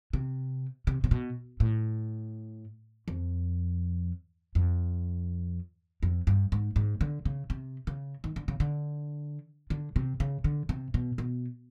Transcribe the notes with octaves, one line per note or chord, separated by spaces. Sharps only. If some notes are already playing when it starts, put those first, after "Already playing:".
C3
C3
C3
B2
A2
F2
F2
F2
G2
G#2
G#2
D3
C#3
C3
C#3
D#3
D3
C#3
D3
D3
C3
C#3
D3
C3
B2
B2